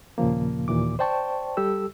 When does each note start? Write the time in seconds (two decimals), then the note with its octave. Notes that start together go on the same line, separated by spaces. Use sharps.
0.18 D#2 A#2 C#3 F3 A#3
0.68 D#2 A#2 E3 D6
0.99 C5 D5 G5 A5 C#6
1.57 G3 G4 A4 E6